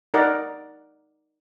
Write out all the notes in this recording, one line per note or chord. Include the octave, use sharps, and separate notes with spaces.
D#4 A#4 D5 F#5